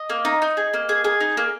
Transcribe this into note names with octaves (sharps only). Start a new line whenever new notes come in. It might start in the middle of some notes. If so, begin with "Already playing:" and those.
Already playing: D#5
A#3
D#4
D#4
G#4
A#3
G#4
G#4
D#4
A#3